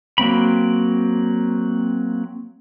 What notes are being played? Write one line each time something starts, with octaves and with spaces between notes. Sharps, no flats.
F#3 A#3 C4 B5